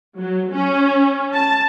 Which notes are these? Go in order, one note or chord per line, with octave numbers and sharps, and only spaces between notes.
F#3
C#4
A5